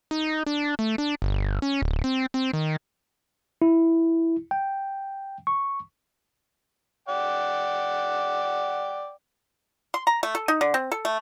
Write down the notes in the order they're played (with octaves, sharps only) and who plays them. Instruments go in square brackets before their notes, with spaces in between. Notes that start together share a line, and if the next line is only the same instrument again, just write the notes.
[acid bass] D#4
D4
A3
D4
G1
C#4
D1
C4
C4
D#3
[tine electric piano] E4
G5
C#6
[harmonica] D5 F#5 G5
[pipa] C6
A#5
A3
A4
D#4
D3
C4
A4
A3